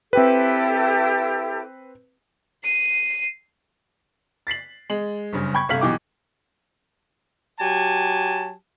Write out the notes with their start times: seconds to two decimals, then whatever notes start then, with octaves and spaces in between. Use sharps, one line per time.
0.13 C4 E4 G4 A4 B4
2.64 C7 D#7
4.47 A6 B6 C7 F#7
4.90 G#3 F#7
5.33 F#1 G2 C#3
5.54 G5 B5 C#6 G#6
5.69 G1 C3 A3 F5 B6 F#7
5.81 B1 B2 E3 G4 D6
7.60 F#3 G4 G#5 A5